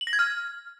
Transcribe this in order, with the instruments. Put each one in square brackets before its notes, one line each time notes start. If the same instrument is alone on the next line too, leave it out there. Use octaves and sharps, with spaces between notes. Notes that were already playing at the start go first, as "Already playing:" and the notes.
[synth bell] F#7
A#6
G#6
F6